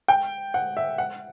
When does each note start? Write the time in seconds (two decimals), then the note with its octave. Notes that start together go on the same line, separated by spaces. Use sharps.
0.08 G5
0.54 F#5
0.77 E5
0.98 F#5